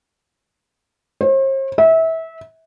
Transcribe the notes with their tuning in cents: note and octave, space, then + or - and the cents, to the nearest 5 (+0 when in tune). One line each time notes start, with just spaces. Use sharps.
C5 +45
E5 -25